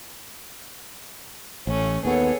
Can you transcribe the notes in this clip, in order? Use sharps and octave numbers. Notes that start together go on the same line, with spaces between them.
A1 A3 C#4
D#2 B3 G#4 A4 C#5